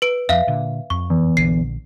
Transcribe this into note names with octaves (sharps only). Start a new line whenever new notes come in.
B4 D7
F2 F3 E5 F5
A#2 D3
F2 C#6
E2
A#1 D3 C7